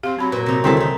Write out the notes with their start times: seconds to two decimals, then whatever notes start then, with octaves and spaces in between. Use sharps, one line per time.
0.03 C4 G4 F5
0.19 F#3 C4 B5
0.32 A#2 B4
0.46 C3 D#4
0.64 C2 D3 D#3 C4 G#4 A4 E5 A5
0.77 D#4 E5